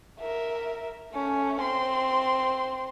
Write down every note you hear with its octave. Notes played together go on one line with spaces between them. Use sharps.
A#4 E5
A3 C#4
C4 C6